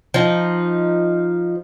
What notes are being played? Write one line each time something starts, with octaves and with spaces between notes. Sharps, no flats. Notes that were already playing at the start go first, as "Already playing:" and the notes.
F3 D#4